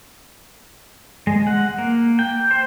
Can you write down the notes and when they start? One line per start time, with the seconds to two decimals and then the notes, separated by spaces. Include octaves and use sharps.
1.27 G#3
1.47 F#5
1.78 A#3
2.19 G5
2.51 C5